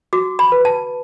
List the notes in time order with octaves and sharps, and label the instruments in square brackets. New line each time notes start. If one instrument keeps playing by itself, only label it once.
[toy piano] F#4 D6
B5
B4
A5